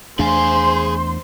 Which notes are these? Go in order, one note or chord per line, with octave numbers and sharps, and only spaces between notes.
E2 A3 D4 G#4 C5 F5 G#5 C6